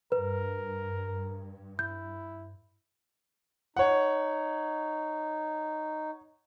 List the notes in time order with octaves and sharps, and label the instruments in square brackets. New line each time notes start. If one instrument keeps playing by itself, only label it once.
[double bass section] G2 [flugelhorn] A#4 [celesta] B4
[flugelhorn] E4 [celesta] G6
[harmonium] D#4 [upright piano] C#5 F#5